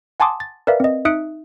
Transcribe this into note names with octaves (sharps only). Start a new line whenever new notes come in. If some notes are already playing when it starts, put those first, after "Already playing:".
F#5 G#5 A5 C6 D6 D#6
A6
A#4 B4 D5 E5 F5
C4 D#5
D#4 E5 D#6 F#6 C#7 D7